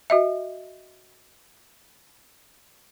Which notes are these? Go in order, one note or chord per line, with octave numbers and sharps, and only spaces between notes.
F#4 D#5 E5